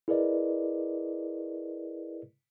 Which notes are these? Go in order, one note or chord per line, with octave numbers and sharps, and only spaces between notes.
E4 G#4 A#4 B4 D5 D#5